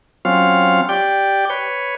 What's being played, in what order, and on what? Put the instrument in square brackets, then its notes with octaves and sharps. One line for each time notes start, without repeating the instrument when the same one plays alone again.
[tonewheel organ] F#3 C4 C#4 F4 F5
G4 D5 G5
B4 C#5